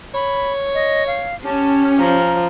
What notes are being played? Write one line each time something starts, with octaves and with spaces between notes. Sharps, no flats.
C#5 B5
D#5
F5
C#4 G4 A5
F3 A#5